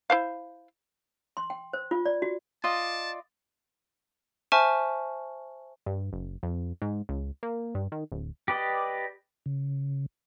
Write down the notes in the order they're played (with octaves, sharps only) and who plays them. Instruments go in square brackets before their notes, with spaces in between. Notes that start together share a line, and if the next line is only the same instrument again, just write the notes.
[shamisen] E4 C5 F5
[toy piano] C6
G5
C5
F4
D5
F#4
[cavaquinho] F4 D5 D#5 [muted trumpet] A5
[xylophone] C5 E5 G#5 A5 C#6 F6
[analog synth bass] G2
F#1
F2
G#2
C#2
A#3
G2
D#3
D1
[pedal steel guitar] G4 B4 D5 D#5
[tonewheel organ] C#3